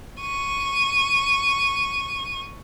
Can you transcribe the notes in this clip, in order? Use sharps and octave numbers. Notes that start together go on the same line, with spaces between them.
C#6 D#7